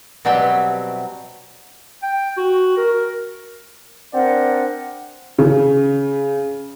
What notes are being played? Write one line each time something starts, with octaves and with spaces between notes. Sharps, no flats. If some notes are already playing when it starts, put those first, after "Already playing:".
B2 F#3 G3 C4 G4 E5
G5
F#4
A#4
C4 D4 A#4 D5 F#5
C#3